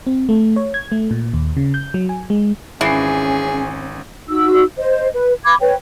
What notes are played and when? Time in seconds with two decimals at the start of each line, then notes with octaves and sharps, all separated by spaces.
0.07 C4
0.29 A3
0.56 C#5
0.74 G#6
0.92 A3
1.11 A#2
1.34 D#2
1.57 C#3
1.74 G6
1.94 F#3
2.09 G#5
2.30 G#3
2.81 G#1 E3 C#4 G#4 C7
4.28 D#4 F#4 E6
4.78 C5 D#5
5.14 B4
5.45 B5 D6 G#6
5.61 B4 C#5 G5